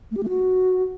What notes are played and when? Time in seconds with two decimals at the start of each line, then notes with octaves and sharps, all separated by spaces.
0.11 A3
0.17 G4
0.23 A3
0.29 F#4